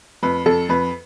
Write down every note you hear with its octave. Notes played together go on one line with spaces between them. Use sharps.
F2 B4
F2 A4
F2 B4